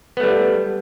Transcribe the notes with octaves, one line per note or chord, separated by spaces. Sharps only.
G3 A3 B3